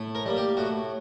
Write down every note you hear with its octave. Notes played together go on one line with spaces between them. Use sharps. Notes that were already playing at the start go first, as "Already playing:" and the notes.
Already playing: A2
A#4
G3 A#3
G4
A2 F#4